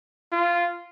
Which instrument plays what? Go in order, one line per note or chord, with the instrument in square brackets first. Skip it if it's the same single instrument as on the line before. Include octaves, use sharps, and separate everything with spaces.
[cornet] F4